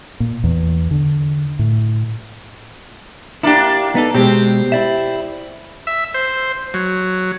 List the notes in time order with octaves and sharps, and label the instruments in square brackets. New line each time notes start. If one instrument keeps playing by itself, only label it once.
[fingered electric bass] A#2
E2
D3
A2
[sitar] A#3 D4 [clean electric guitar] E4 G4
[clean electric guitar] B3 D#4 A4
[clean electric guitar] B2 G#3 [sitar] C4 G4
[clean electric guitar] E4 D5 E5
[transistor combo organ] E5
C5
F#3